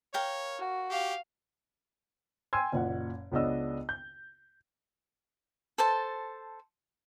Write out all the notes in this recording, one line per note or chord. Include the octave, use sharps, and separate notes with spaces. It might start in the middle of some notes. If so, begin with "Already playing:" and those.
A#4 C#5 F5 G5
F#4
G4 F5
G5 G#5 C6 E6 G#6
F#1 A#2 F#5
C#2 C#3 B3 D4 D#5 E6
G6
A4 C5 A5